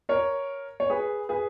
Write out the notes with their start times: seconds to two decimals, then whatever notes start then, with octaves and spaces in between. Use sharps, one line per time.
0.09 A#4 C#5
0.80 C#5
0.90 G#4 B4
1.29 G#4 B4